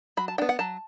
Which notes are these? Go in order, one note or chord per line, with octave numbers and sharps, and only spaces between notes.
F#3 B5
A5
B3 D4 G5
F#5
F#3 A5